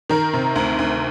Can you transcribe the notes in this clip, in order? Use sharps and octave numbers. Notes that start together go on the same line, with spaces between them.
D#3 A#4
C3
D2
D2